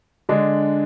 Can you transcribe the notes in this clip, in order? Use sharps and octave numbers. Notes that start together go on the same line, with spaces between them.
D3 G#3 D4